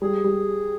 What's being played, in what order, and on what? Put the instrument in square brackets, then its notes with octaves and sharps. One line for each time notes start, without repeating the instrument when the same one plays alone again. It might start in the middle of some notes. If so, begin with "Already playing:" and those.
[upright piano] G3 [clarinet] G#4
[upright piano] G3